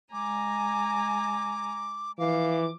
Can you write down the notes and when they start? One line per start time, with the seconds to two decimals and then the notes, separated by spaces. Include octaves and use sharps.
0.13 G#3 G#5 A#5 D6
2.19 E3 F3 F5 D6